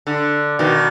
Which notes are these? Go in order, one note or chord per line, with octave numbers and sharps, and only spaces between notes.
D3
B2 D#3